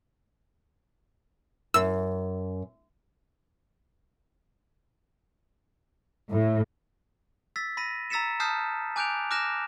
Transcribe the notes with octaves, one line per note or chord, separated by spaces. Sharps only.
F#2 E6
A2
E6 A6 B6
B5 A#6 D#7
A#5 E6 A6 B6 C#7 E7
A5 D#6 F6 G6 C7
G#5 D6 F#6 G6 D7 F7
D6 F6 F#6 A#6 E7